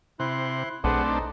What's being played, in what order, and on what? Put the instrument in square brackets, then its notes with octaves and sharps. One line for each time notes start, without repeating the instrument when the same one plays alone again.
[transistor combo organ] C3 [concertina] E4 C6 F#6
[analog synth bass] B1 [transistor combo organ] A3 C4 D4 [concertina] G#4 B4 F#5
[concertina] D#4